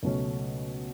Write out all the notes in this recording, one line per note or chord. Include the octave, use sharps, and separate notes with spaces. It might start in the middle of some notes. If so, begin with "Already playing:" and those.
C#2 B2 F#3 A3 C#4